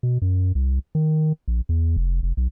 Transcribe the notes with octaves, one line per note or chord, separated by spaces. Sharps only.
B2
F#2
C2
D#3
A#1
E2
F1
F1
B1